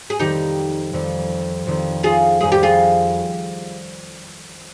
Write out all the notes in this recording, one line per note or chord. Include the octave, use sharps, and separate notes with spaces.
G#4
F2 D#3 G3 C4 D#4 G4
F2 D#3 G3 C4
F2 D#3 G3 C4
F4 G#4
F2 D#3 G3 C4 G#4
G4
F4 G#4